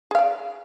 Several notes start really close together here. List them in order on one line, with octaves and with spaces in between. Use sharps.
G#4 F5 D5